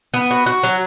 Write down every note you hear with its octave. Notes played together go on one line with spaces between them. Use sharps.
B3
F#4
F#4
F#3